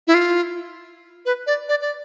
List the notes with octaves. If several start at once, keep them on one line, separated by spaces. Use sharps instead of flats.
E4
F4
B4
D5
D5
D5